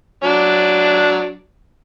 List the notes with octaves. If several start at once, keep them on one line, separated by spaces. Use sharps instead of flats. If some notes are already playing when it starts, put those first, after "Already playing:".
F#3 D4